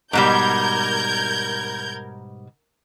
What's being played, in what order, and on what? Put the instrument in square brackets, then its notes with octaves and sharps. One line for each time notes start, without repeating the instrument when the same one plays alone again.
[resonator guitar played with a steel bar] G#2 B2 G3 [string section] A#4 G6 G#6